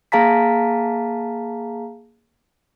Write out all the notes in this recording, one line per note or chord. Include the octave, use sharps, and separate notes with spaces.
A#3 G#4 F5 A5 A#5 B6